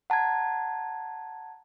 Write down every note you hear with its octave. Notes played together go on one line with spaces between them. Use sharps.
F#5 A5 A#5 G#6